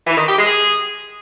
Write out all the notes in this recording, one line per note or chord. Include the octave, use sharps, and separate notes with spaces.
E3
D#3
G4
G#3
G#4